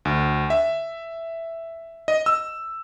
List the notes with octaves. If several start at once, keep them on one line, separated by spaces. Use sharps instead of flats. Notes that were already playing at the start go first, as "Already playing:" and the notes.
D2
E5
D#5
E6